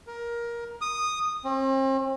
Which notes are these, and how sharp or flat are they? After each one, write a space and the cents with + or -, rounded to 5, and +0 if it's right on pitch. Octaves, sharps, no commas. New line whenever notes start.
A#4 +15
D#6 -10
C4 +40